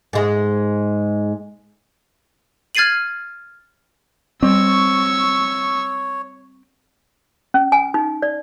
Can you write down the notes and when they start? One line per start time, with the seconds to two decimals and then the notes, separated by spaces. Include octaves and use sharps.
0.13 G#2 G#3
2.75 F6 G#6 A6 C7 D#7 F#7
4.43 G3 C4 C#5 C#6 E6
7.54 C#4
7.72 G#5
7.94 D#4
8.22 D5